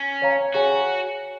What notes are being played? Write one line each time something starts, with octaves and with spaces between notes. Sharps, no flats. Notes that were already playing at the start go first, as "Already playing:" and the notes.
Already playing: C#4
C#5 F5 A#5
F#4 G#4 C#5 G#5